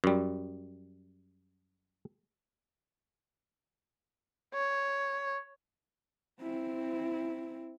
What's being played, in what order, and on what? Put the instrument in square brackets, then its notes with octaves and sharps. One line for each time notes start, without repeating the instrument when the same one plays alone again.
[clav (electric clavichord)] F#2 G3
[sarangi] C#5
[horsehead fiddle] C4 E4